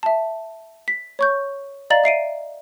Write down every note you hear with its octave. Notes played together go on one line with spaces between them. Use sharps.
E5 A5
B6
C#5 C#6 G6
D5 D#5 F5 A#5 A6 F#7
E5 C7 D7 D#7